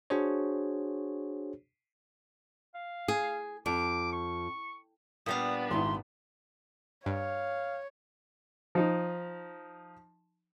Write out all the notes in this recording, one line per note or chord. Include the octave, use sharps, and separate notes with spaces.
D4 F#4 G#4 C5 C#5
F5
G#4
F2 D6
C#6
A#2 G3 B3 D4 F5 D#6
G#1 E4 C6
G2 C#5 F5
F3 D#4